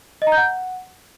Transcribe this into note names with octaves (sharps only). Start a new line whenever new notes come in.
D#5
A#5
G6
F#5